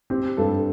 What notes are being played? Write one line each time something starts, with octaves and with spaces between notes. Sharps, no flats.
C4 G4
G2 A4